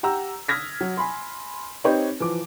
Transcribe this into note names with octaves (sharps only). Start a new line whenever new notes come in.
G4 F#5 A#5 E6
D#6 F6 G#6 A#6 B6
F#3
G#5 B5 C6
C4 D#4 G4 B4 C#5
E3 F3 D6